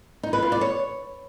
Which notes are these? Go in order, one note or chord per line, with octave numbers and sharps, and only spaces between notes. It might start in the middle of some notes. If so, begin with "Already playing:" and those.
D#4
B4
F4
D5
C#5